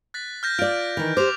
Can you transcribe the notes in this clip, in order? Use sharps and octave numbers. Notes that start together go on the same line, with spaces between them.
F#6 A6 B6
F6 G6 A#6
F4 D5 F6 D7
D#3 E3
G4 C5 D6 F7